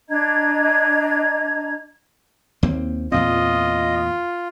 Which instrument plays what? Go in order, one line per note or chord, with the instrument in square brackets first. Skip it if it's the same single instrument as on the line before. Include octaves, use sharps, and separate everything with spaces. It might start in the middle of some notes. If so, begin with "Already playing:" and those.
[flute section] D4 D#5 A#5 G#6
[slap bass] D#2 A#3 C4
[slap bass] E2 A#2 C4 [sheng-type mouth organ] F4 [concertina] D#5